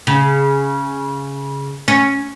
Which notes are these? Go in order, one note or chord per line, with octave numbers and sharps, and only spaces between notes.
C#3
C#4